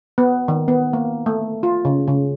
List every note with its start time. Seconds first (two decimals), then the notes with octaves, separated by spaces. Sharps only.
0.18 B3
0.48 D#3
0.68 B3
0.93 A#3
1.26 A3
1.63 F4
1.85 C#3
2.08 C#3